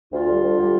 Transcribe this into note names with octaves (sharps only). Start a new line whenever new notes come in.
D2 F4
D3 G3
D2
D3 G3